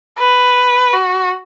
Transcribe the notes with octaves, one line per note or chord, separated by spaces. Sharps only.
B4
F#4